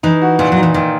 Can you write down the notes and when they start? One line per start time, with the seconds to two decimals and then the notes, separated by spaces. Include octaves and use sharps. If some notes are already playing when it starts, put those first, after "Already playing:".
0.03 E3 D#4
0.22 F#4
0.39 A#2 E3
0.52 F#3 D#4
0.63 E3
0.74 A#2 D#3